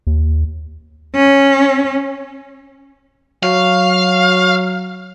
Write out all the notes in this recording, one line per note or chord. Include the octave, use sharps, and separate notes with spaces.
D#2
C#4
F#3 F5